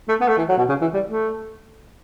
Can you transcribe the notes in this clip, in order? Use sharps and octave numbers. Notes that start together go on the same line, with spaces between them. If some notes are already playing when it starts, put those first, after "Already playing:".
A3
B3
A3
E3
F#3
B2
C#3
E3
G3
A3